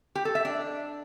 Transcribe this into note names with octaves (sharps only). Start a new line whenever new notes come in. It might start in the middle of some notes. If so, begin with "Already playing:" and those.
G4
A4
E5
D4